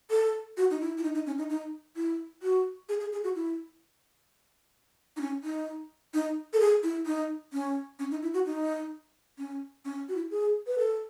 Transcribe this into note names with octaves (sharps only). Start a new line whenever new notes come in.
A4
F#4
D#4
E4
E4
D#4
D#4
C#4
D#4
D#4
E4
F#4
G#4
G#4
G#4
F#4
E4
D#4
C#4
D#4
D#4
A4
G#4
E4
D#4
C#4
C#4
D#4
E4
F#4
D#4
C#4
C#4
F#4
E4
G#4
B4
A4